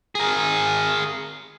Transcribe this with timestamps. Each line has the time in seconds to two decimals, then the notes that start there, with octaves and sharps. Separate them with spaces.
0.15 G#4 A#4